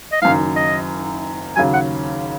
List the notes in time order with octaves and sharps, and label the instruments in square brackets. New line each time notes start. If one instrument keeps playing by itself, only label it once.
[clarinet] D#5
[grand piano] F#1 F#2 D#3 [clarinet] F5
[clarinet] D#5
[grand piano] D#2 C#3 F#3 [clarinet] G#5
[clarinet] F#5